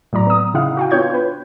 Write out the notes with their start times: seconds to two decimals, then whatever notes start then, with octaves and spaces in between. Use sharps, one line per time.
0.13 A2 F#3 D5 A#5
0.27 B3 D#6
0.54 C#3 D#4 E4 F5 F#5
0.77 F#4 F5 G5
0.91 B3 D4 F4 C#5 G6 G#6
1.14 B4